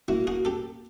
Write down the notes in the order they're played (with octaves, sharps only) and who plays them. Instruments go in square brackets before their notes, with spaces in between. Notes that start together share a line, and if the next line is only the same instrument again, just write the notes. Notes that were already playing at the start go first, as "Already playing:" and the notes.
[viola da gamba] A#3 [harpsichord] E4 F#4
[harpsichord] F#4 G#4
G4 A4